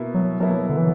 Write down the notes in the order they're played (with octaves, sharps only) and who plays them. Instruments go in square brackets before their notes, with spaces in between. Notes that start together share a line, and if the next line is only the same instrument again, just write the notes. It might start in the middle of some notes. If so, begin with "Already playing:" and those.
Already playing: [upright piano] B2 A#3 E4
[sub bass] F#3
[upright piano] B2 A#3 E4 [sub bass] F#3
[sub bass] D3
E3